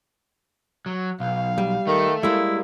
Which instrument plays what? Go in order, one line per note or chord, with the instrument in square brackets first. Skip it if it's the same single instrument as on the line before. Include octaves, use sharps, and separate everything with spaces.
[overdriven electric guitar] F#3
[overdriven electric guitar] B1 [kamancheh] F5
[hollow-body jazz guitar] G3
[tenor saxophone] D#3 [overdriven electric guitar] A3
[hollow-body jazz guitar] G3 G#3 [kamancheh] A#3 [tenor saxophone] E4